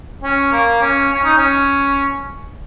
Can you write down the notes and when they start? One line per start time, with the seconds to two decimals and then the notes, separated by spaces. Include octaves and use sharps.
0.23 C#4
0.52 A#3
0.82 C#4
1.13 C#4
1.24 D#4
1.37 C#4